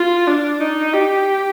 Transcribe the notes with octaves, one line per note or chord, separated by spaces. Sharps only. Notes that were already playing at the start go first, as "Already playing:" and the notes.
Already playing: F4
D4
D#4
G4